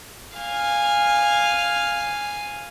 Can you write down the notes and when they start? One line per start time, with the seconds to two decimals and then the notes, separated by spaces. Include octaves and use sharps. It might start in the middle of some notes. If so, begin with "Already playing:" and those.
0.37 F5 G#5